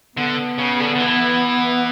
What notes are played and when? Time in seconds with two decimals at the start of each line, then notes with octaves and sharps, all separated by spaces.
0.16 D3 B3
0.58 C#3
0.80 D3
0.95 D3
1.00 E3